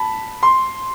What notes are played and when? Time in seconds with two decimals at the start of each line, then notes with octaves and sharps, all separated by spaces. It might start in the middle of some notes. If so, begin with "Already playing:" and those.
Already playing: A5 B5
0.43 C6